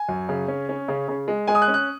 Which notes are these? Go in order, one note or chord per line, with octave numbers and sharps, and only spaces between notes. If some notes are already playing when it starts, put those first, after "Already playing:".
Already playing: G#5
F#2
C#3
C#4
C#4
C#3
C#3
G#3
G#3 G#5
D#6
F#6
C#4
F#6